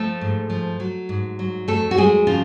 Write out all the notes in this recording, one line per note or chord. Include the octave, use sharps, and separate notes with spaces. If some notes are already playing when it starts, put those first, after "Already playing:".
Already playing: F3 A3 A4
G#2
F3
F#3
G#2
F#3
F2 A3 A4
F#4
F#3 G#3 G#4
C#3 F3 F4